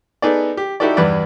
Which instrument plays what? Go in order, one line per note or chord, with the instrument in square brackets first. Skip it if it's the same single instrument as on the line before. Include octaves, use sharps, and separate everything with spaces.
[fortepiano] B3 D#4 G#4 A4 D5
G4
D#4 E4 F#4 G4 A4 D5
E2 G2 B4 D5